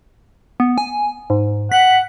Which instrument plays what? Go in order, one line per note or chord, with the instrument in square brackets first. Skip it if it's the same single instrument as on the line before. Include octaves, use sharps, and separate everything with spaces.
[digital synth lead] B3
G#5
G#2
[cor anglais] F#5 [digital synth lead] B6